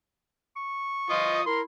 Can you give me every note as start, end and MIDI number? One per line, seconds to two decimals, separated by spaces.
0.56 1.41 85
1.10 1.41 53
1.10 1.41 65
1.10 1.41 75
1.10 1.41 87
1.46 1.64 64
1.46 1.61 70
1.46 1.59 84